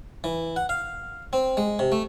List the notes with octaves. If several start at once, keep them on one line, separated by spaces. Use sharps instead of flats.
E3
F#5
F5
C4
G#3
C3
A3